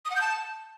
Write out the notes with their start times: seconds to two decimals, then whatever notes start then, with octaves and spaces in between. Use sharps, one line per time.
0.05 D#6
0.10 F#5
0.16 G6
0.21 A5